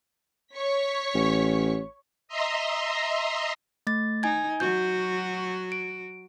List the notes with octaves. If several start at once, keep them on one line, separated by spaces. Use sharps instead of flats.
C#5 C#6 B6
A1
D#5 E5 A#5 C6
A3 A6
D#4 G#5 G#6
F#3 F#4 G6
D7